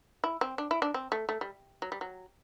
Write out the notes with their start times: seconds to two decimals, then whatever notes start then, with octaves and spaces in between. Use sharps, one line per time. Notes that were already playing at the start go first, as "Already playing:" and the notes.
0.24 E4
0.41 C4
0.58 D4
0.71 E4
0.82 D4
0.94 C4
1.12 A3
1.29 A3
1.41 G3
1.82 F#3
1.92 G3
2.01 F#3